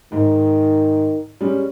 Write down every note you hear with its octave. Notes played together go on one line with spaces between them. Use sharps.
G#2 D#3
G3 G#3 C#4